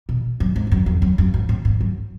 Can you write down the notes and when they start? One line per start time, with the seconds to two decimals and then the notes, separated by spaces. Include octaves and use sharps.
0.09 B2
0.40 F#2
0.56 G#2
0.67 F2
0.72 F#2
0.86 F2
1.02 F#2
1.18 F#2
1.34 G#2
1.49 A2
1.65 G#2
1.81 F#2